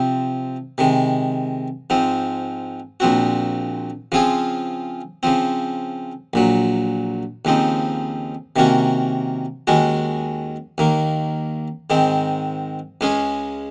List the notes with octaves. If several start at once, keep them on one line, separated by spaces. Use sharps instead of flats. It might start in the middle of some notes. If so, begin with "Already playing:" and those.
Already playing: C3 F3 C4
C3 D#3 G#3
G#2 F3 C4
A#1 A#2 F3 C4 F#4
C#3 F3 C4 F4 G#4
C#3 F3 C4
A#1 A#2 F#3
D#2 C#3 F3 C4 D#4
C3 D#3 A#3 C#4 F#4
D#2 D#3 G#3 C#4 F#4
D#2 D#3 A#3
G#2 D#3 G#3 C4
C#2 C#3 G#3 C#4 G#4